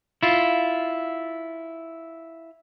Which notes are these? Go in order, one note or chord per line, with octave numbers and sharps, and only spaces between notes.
E4 F4